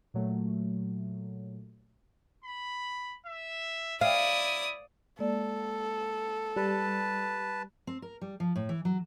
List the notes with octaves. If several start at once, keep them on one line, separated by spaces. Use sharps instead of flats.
A#2 F#3 A3
B5
E5
E4 D5 F5 D#6
G#3 A#3 A4 D5
G3 B4 A5
C4
A#4
G3
F3
A2
E3
F#3